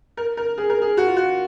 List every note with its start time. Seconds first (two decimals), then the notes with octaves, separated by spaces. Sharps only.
0.17 A#4
0.37 A#4
0.58 G#4
0.70 A#4
0.82 G#4
0.97 F#4
1.07 F4
1.17 F#4